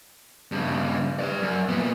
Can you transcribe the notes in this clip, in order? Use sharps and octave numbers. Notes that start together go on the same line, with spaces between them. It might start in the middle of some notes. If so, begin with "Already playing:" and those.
G2 C#3
B4 D5
F#2
A#2 B3